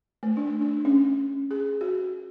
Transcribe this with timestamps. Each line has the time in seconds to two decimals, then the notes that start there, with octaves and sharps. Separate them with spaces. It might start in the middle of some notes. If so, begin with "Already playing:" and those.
0.23 A3
0.37 D4
0.61 D4
0.85 C#4
1.51 G#4
1.81 F#4